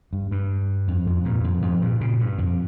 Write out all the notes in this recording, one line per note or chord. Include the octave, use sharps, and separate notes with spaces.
G2
G2
F2
F2 G#2
G2 A#2
F2 G#2
F2 G#2
G2 A#2
A#2 C#3
G2
F2